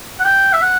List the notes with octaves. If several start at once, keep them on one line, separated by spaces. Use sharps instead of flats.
F#5
G5
E5
F#5